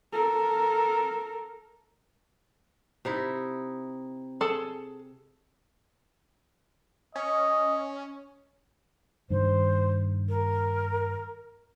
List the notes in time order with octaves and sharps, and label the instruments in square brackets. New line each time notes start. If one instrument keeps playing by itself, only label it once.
[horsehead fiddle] A4 A#4
[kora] C3 D#4 E4
[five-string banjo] G#4 A4 A5
[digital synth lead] C#4 [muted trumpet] D#5
[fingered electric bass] G2 D#3 [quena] C5
[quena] A#4